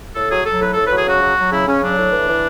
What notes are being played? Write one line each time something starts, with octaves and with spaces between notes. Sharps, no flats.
A2 A4
F#3 G#4
F#3 A4
A2 B4
A2 A4
B4
F#3 G#4
C#3 F#4
F#3
F#3
C#3 E4
C#3 C#4
F#3 D4
A2
E3
E3